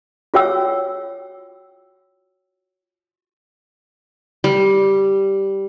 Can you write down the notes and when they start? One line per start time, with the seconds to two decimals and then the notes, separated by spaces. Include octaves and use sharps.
0.34 F4 F#4 C#5 G5 E6
4.44 G3